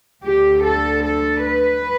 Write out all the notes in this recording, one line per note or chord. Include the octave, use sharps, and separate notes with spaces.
D2 D3 G4
A4
A4
B4